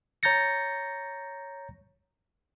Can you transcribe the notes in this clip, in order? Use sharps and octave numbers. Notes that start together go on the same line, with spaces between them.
C#5 A#5 G6 A6 A#6 C#7